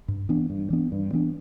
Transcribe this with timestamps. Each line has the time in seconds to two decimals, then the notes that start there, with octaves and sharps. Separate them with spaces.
0.08 G2
0.29 E3 B3 D4
0.50 G2
0.70 E3 B3 D4
0.92 G2
1.13 E3 B3 D4